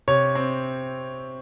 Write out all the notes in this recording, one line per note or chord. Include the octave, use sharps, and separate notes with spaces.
C3 C#5
C4